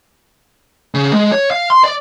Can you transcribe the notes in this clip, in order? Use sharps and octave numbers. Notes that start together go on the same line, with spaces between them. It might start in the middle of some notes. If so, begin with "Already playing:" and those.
C#3
G#3
C#5
F5
C6
D5